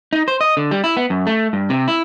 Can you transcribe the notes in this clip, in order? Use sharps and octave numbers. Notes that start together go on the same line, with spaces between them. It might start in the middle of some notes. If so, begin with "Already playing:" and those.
D#4
C5
D#5
D3
G3
E4
B3
F#2
A3
G2
C3
E4